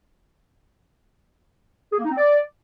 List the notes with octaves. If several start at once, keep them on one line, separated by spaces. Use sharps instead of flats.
G#4
A#3
D#4
C4
D5